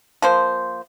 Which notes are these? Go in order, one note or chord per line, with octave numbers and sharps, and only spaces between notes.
F3 A#3 C5